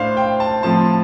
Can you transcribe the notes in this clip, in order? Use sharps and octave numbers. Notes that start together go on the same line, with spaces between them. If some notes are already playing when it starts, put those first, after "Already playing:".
Already playing: A2 A3 D4 C5 F5
G5
A5
A2 F3 C4 A5